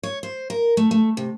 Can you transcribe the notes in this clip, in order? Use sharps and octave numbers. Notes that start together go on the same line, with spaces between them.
C#5
C5
A#4
A3
A3
C3